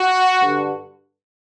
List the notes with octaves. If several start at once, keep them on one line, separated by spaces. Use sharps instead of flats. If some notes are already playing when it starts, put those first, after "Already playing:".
Already playing: F#4
G2 D3